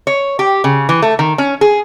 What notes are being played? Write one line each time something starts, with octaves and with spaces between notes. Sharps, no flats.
C#5
G4
C#3
E3
A3
D#3
C#4
G#4